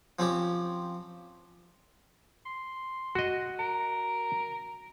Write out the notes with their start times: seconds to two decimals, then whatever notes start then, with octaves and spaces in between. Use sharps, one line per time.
0.19 F3 C4 C#4 F4 G4
2.46 C6
3.15 F#4 D#5
3.59 A#4